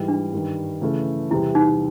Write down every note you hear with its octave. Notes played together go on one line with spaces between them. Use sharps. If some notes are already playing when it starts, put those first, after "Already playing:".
Already playing: G#2 E3 G3
D4
G2 D#3 G3
C#3 E3 A3
E2 C3 E3 G3 E4
D#4